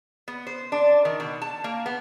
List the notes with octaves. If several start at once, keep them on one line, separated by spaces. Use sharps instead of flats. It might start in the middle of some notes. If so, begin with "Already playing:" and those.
B3
C5
D4
D#3
B2
A5
A#3
B3